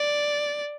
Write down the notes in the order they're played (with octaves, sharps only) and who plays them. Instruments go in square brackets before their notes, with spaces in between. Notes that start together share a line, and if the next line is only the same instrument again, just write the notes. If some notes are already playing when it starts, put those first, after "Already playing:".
Already playing: [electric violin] D5